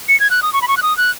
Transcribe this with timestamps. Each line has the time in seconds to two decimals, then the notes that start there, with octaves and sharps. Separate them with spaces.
0.08 C#7
0.20 G#6
0.30 F#6
0.42 D#6
0.53 C#6
0.62 B5
0.68 C#6
0.77 F#6
0.83 D#6
0.97 F#6